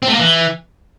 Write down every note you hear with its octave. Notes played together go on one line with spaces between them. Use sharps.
C4
A3
A#3
E3